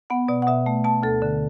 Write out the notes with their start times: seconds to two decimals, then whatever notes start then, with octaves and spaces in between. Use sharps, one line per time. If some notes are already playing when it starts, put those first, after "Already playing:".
0.10 B3 F#5
0.28 B2 D5
0.42 F#5
0.47 B2 E5
0.66 A3
0.84 B2 A5
1.03 D2 A4
1.22 D3